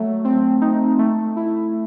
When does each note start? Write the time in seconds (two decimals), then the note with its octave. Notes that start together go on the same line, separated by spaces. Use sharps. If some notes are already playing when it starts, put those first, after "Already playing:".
Already playing: F#3 A3
0.25 C4
0.61 D#4
0.99 A3
1.36 E4